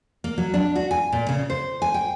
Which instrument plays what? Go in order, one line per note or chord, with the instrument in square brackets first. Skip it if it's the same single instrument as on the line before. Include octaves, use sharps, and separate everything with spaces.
[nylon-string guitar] A#3
F#3
D4
F#4
G#5
A#2
C#3
C5
G#5
G5